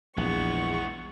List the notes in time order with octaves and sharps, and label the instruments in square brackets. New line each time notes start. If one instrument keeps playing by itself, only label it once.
[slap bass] A#1 [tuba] E2 [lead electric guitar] G#3 B3 [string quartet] C#6